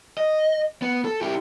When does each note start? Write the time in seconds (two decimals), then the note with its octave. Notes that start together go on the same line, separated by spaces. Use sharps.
0.18 D#5
0.82 B3
1.05 A4
1.21 E4 G4